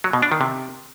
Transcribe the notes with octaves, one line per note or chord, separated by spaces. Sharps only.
F#3
B2
D4
D#3
C3